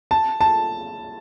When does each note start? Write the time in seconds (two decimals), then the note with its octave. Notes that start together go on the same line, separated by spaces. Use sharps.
0.11 A5
0.41 A5